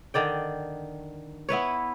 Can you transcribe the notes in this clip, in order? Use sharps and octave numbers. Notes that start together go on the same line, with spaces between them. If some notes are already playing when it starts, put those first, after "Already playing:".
D3 D#3 D5 G5
B3 E4 B4 C#5